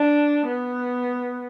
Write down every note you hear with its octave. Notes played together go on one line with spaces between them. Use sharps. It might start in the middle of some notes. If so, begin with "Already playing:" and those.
Already playing: D4
B3